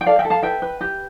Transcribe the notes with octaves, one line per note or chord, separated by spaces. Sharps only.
G5
A4 D5 F5
E5 G5
A4
F5 A5
B4 E5 G5
B4
G4